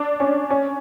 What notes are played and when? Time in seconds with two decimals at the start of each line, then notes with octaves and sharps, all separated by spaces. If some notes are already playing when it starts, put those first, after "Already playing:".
Already playing: D4
0.20 C#4
0.50 C#4